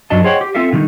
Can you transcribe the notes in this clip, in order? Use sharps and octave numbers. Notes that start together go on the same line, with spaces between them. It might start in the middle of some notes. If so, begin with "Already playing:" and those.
F#2 F#3 D4 D#5 A5
G#4 C5 C#5 D#5 F#5 G5
G4
C4 F4 A4 E5 F5
D3 D#3 G3 C#4 D#4